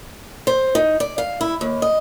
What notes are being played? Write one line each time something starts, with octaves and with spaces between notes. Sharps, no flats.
C5
D#4
D5
F5
E4
D#2
D#5